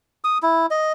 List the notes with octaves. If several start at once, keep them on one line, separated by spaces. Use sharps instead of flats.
D#6
E4
D#5